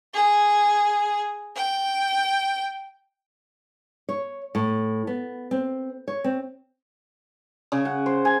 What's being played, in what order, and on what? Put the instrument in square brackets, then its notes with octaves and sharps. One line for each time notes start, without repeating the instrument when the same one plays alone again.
[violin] G#4
G5
[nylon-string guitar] C#5
A2
B3
C4
C#5
C4
[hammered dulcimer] C#3
F#5
C5
G#5